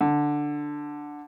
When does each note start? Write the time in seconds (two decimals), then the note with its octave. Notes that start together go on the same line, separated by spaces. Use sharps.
0.01 D3